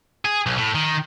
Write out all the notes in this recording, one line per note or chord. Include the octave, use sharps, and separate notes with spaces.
G#4
B1
A2
D#3